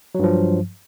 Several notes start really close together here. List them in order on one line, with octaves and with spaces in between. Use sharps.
F#3 G2 F3